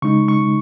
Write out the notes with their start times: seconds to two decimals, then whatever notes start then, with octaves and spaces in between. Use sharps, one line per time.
0.02 C#3 G#3 D#4 C#6
0.28 C#6